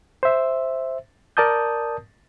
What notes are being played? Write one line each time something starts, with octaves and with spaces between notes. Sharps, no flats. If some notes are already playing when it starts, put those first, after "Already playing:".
C5 E5
A#4 D5 A5 D#6 G6